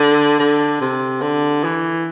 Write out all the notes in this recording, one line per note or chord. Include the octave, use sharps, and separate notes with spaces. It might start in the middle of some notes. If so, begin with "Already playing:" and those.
Already playing: D3
D3
C3
D3
E3